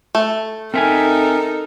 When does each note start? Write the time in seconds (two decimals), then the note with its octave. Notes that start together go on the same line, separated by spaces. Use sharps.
0.15 A3
0.74 C4 D#4 A4 A#4 E5 G#5